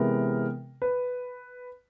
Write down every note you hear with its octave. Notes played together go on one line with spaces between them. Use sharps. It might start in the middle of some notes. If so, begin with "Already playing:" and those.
Already playing: C3 E3 G#3 B3 A#4
B4